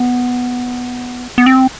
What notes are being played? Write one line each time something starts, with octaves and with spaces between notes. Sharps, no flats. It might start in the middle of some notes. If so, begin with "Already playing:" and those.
Already playing: B3
B3
C4